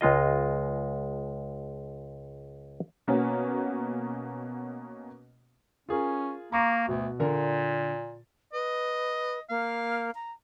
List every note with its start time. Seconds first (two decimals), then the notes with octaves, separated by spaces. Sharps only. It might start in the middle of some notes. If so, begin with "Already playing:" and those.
0.01 C#2 G#3 F4 D#5
3.07 B2 A#3 B3 C#4 F#4
5.89 C#4 F4 G#4 A#4
6.52 A#3 A#5 C#6 D6
6.88 D2 B2
7.20 A#2 D3 A#4
8.53 B4 D#5
9.50 A#3 F5
10.15 A#5